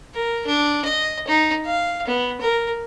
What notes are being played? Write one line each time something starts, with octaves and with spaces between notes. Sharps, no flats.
A#4
D4
D#5
D#4
F5
B3
A#4